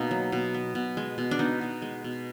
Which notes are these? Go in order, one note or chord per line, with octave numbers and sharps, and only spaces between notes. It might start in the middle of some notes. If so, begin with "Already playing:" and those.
Already playing: B2 A#3 D#4
F#3
B2
B3
B2
G#3
B2
D4
B3 D#4
B2
G#3
B2